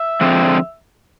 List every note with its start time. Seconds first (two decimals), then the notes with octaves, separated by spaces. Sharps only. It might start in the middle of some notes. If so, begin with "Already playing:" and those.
Already playing: E5
0.21 D3 F3 G#3 C4